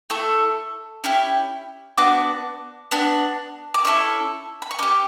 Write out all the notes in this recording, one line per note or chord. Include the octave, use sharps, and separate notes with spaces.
A3 E4 A4 C#6
C#4 E4 G4
B3 D4 F#4 D6
B3 D4 F#4
D6
C#4 E4 A4 C#6
B5
C#6
C#4 G4 D6